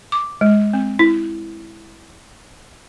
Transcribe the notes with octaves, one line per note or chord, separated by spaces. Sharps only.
D6
G#3
C4
E4